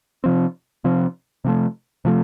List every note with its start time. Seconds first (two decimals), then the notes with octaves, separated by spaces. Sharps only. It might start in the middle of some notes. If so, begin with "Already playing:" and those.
0.24 C3 F3 C4
0.84 C3 F3 C4
1.44 C3 F3 A3
2.05 C3 F3 A3